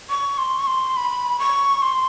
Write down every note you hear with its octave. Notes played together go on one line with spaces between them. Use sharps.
C#6
C6
C#6
C6
B5
C#6
C6